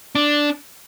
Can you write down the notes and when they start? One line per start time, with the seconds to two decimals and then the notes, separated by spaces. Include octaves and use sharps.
0.15 D4